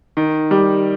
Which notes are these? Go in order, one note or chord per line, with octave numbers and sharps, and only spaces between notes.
D#3
G3